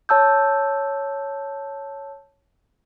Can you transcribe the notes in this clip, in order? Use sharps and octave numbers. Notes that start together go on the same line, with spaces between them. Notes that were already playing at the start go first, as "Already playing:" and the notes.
C#5 A5 E6 G6